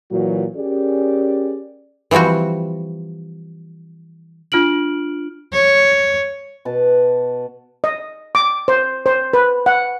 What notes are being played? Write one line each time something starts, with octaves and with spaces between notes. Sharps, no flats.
A#2 E3 F#3 F#4
C#4 G4 G#4 A#4 D5
E3 F3 G3 C4 F#4
D4 F4 F6 D7 F#7
C#5
B2 B4 A5
D#5
D6
C5
C5
B4
F#5